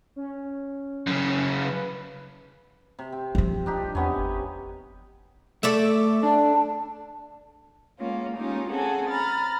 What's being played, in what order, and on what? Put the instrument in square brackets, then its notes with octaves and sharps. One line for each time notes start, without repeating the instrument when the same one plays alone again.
[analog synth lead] C#4
[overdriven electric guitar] F#2 C#3
[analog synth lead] B4
[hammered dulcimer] C3
C4
[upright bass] F3 F4
[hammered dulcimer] D4 D#4 G4
[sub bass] E2 [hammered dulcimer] C3 B3 C#4
[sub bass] G1
[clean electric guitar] A3 [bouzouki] A4 D5 E5
[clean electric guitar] D4 [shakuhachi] A5
[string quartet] G#3 A#3 B3 C#4 F4
G#3 A#3 C#4 D#4 F4 G4
C4 C#4 G#4 A4 F#5 G#5
A#5 B5 F6 A6